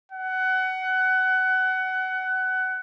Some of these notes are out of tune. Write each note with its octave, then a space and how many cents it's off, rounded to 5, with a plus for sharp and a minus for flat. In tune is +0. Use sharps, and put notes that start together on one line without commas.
F#5 +20